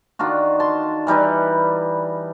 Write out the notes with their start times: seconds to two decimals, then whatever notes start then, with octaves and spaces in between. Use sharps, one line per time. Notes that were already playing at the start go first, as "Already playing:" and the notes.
0.19 D#3 D4 F4 F#4
0.60 A5 C6
1.07 E3 G3 D#4 B4